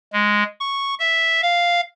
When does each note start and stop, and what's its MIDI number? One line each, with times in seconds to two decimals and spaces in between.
0.13 0.43 56
0.60 0.95 85
0.99 1.41 76
1.42 1.81 77